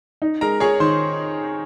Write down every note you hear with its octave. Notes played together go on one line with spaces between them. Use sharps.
D#4
G#3 A#4 A#5
G#4 C#5 C#6
D#3 C5 C6